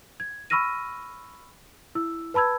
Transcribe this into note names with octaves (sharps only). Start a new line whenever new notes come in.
G#6
B5 C#6 E6 F6 A#6 D#7
E4 E6
B4 A5 B5 E6 G#6